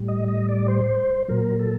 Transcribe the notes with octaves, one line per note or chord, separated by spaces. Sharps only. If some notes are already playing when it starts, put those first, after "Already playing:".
Already playing: A2 G3
D#5
D#5
D5
C5
A#2 F#3 A#4
A4